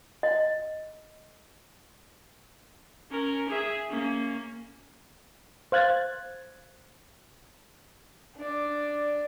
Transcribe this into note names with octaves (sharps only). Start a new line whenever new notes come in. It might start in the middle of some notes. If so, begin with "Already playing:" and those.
D#5
C#4 A#4
G#4 E5
A#3 C#4
C5 F5 F#6 G#6 A6
D4 D5